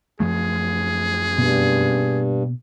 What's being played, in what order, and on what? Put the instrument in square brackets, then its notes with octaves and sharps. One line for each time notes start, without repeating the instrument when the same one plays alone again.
[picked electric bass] F#2 F3 A3 [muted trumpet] G#4
[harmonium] G2 [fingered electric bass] B2 A#3 B3